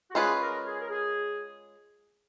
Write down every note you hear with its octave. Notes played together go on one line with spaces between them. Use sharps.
F#4
G#3 C#4 F4 G#4 B4
A#4
G#4
A#4
G#4